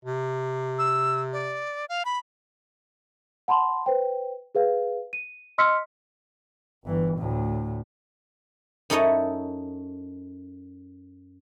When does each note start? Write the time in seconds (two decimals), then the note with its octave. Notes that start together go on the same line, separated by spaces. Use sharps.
0.05 C3
0.79 E6
1.33 D5
1.89 F5
2.05 B5
3.48 F#5 A5 B5 C6
3.86 B4 C5 G5
4.55 G#4 B4 F5
5.13 D#7
5.58 D#5 C6 E6 F6 B6 C#7
6.85 G1 E3
7.18 D2 A2
8.90 F#2 D#4 E4 A4 C#5 D#5